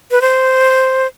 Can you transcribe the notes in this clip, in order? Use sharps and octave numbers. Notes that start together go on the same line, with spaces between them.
B4
C5